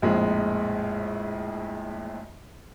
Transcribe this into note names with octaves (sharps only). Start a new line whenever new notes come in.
A#1 F2 A2 G#3